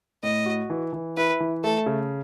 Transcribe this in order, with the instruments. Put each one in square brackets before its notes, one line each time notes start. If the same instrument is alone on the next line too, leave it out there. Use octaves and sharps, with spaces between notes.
[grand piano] A2 [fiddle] D#5
[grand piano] F#4
E3
E3
[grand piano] E4 [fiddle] B4
[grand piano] E3
[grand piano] A3 [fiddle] A4
[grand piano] C#3